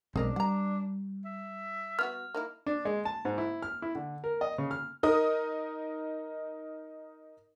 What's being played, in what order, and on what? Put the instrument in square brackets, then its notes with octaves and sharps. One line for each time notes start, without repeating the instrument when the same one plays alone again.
[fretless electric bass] B1 G#3 C4 [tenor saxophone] D4 [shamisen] G#4 A#4 D#5
[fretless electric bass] G3 [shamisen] F#5 A#5
[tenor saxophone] E5
[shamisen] B3 F4 F#4 [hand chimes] F6
[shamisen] A#3 D#4 E4
[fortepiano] D4
G#3
A5
G#2
E4
F6
E4
D3
A#4
D#5
C#3
F6
[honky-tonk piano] D#4 A#4 D#5 D#6